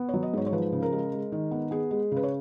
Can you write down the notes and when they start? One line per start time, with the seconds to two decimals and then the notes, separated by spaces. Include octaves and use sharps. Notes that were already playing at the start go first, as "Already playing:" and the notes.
Already playing: B3
0.09 F#3 C#5
0.23 D#5
0.33 G#2 C#5
0.47 C#5
0.52 F3 B4
0.72 C#3
0.83 A#4
0.92 G#3
1.13 G#3
1.32 D#3
1.51 B3
1.71 B3 G#4
1.91 G#3
2.12 C#3 B4
2.23 C#5